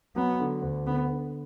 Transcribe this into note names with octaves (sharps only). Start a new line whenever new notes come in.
F#3 B3
D3
D2
D3 B3
D3